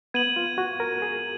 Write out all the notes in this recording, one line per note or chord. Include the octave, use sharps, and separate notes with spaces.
B3 G#6 D#7 F#7
F4
F#4
A#4
G#4